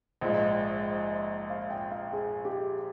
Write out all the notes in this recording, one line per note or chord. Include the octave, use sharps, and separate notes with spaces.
A#1 G#2 F3 G#3 D#5
F5
G5
F5
G#4
G4